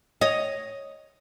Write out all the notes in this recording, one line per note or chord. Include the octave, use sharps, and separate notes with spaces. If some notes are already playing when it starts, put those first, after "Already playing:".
C#5 D#5